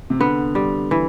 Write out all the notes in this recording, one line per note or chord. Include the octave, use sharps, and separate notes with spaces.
C3
D3 B3
G3
E3